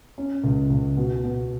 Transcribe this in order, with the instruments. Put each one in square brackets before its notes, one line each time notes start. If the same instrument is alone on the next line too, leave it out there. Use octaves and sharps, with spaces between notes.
[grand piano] C#4
C#2
C#2
B2
B2